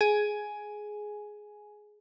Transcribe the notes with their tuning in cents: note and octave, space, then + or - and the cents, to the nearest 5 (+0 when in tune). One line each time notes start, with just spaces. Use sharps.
G#4 +10 G#5 +5